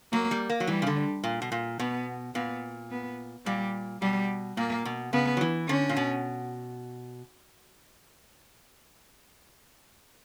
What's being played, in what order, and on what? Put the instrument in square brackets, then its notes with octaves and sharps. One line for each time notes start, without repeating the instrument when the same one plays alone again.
[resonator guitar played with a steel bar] F#3 [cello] A#3
[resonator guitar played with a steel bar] G3
A#3
F#3
[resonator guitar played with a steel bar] E3 [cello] G3
[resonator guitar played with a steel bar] C#3
D3
A#2
B2
A#2
[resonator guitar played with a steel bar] B2 [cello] B3
[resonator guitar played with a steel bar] A#2 [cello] B3
[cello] B3
[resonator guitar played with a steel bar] A#2 [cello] G3
[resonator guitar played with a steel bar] B2 [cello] G3
[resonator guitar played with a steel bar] A#2 [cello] A#3
[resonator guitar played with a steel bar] B2
[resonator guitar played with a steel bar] C#3 [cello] B3
[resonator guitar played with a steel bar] F#3
E3
[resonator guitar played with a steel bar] D3 [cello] C#4
[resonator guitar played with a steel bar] A#2
B2